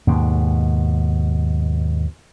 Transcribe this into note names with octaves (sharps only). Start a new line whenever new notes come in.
D#2 G#2 B2